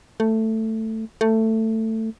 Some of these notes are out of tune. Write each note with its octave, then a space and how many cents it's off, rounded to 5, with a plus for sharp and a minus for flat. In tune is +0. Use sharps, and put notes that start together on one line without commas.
A3 +10
A3 +15